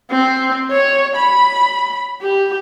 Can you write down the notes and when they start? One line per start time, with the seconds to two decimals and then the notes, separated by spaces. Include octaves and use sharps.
0.11 C4
0.71 C#5
1.16 B5
2.22 G4